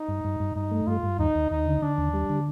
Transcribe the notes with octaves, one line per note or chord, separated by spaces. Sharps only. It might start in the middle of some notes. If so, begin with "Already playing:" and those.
Already playing: D#4
G2
G2
G2
G2 D#4
A3
G2 F4
G2
D#2 D#4
D#2
D#2 D#4
D3
D3 D4
D#2
G3
D3